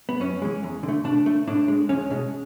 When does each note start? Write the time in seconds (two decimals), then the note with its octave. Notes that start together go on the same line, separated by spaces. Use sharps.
0.09 B3
0.20 F#2 C#4
0.42 E3 G#3
0.63 E2
0.83 D3
0.88 A3
1.04 B2 D4
1.26 A3
1.47 A2 D4
1.68 G#3
1.89 E2 C#4
2.10 B2 G#3